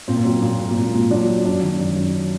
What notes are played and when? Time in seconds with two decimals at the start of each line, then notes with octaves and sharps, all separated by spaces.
0.08 A#2 C4
0.16 A#3
0.25 F#3 C4
0.42 A#2 A#3
0.60 A#2
0.68 A#3
0.76 A#2 C4
0.94 A#2
1.10 F#3 D4
1.27 F#3
1.45 F#2 D4
1.62 D#3
1.79 F#2
1.96 F#2